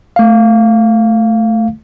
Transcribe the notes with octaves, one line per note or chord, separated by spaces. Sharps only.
A3 F5